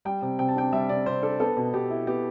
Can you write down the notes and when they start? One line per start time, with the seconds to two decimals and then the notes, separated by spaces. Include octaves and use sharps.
0.05 G3 G5
0.22 C3
0.39 C3 G5
0.48 A5
0.56 D4 G5
0.72 G3 E5
0.89 C3 D5
1.06 C3 C5
1.23 D4 A4
1.40 B3 A4
1.57 B2
1.74 B2 G4
1.90 E4
2.07 B3 G4